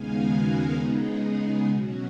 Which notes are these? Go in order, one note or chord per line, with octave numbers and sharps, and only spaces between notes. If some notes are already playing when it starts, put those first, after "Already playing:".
Already playing: D#2 C#3 G#3 B3 D#4 F5 G#5
F#4 A#4
C#3 G#3 B3 D#4 G#4
G#4
B2 F#3 C#4 F#4